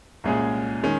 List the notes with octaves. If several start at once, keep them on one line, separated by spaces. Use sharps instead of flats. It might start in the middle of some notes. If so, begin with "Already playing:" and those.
C2 A#2 G#3 C#4 G#4
D#3 G#3 C#4